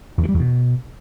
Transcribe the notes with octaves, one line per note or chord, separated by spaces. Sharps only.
E2
D#3
G3
E2
B2